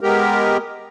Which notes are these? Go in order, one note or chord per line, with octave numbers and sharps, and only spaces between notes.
G#3 B3 G4 A#4